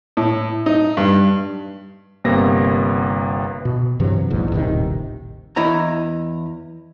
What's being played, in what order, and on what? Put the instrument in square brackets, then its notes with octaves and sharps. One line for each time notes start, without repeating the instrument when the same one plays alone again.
[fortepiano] A2
D#4
G2
[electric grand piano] G1 C3 A#3 B3 A#6
[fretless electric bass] B2
G2 C3 E3 F#3
A#1 E2 G#2
D#1 A1 C3 D#3
[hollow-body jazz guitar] E2 E4 D#5 A#5